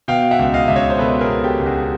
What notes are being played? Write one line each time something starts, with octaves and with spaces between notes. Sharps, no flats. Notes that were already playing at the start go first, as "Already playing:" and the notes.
B2 F5 G5
E5 F#5
C#2
D#5 F5
C#2 E5
C#5 D#5
C5
B2 A4 B4
G#4 A#4
B2
G4 A4
C#2
F#4 G#4